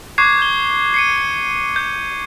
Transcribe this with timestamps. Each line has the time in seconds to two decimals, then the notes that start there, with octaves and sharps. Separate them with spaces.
0.18 C#6 D6 F#6 G#6 C7
0.39 G6 G7
0.94 C7 C#7 D#7
1.76 G6